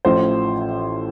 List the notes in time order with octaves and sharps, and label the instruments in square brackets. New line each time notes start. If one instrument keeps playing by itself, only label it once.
[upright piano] A1 A2 F3 C5